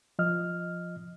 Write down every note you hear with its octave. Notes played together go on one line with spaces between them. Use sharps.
F3 D#5 F6